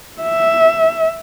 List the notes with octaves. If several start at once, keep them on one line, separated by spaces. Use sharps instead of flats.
E5